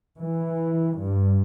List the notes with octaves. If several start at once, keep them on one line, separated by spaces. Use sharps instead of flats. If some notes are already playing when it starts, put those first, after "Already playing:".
E3
G2